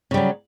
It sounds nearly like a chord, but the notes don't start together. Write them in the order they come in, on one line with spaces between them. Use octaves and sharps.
C#3 G3 F#3